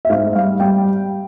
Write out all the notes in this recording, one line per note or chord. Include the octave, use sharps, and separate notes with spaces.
E5
G#2 F5
G3 F5
G3 G5